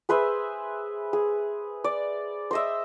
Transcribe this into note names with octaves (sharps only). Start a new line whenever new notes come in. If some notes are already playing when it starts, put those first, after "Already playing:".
G#4 B4 C5 E5
G#4
D5
C5 D#5 E5